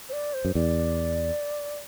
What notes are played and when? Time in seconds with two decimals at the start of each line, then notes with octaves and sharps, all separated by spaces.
0.09 C5
0.13 D5
0.34 C5
0.45 F#2
0.55 E2 D5